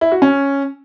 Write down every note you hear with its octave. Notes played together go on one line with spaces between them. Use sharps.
E4
F#4
C#4